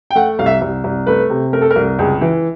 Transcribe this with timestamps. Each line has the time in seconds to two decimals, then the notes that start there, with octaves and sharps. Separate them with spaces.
0.10 G5
0.15 A3 F#5
0.39 C2 F5
0.46 E5
0.62 C2
0.84 C2
1.07 A3 B4
1.30 C3
1.53 A3 A#4
1.62 A4
1.70 A#4
1.76 C2
1.99 C#2 G#4
2.21 E3